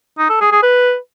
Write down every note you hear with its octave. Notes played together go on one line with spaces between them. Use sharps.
D#4
A4
G#4
G#4
B4